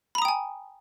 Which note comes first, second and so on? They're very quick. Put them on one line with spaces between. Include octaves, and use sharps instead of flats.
B5 A#5 D#6 G5 G#5